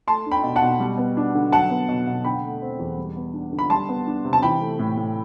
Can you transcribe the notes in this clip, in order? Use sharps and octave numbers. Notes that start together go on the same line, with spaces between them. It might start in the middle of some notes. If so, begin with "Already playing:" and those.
A3 A5 C6
D4
G5 B5
B2
F#5 A5
B2
G3
B3
D4
D3
F#3 F#5 A5
B3
B2
B2
D3 G5 B5
A3
C4
E2
G3
B3
D4
D3
B5
G3 A5 C6
B3
D4
C3
A5
E3 G5 B5
A3
A2
A2